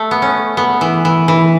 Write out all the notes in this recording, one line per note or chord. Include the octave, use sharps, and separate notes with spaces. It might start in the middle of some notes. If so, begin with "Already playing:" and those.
Already playing: A3
B3
C#4
B3
E3
E3
E3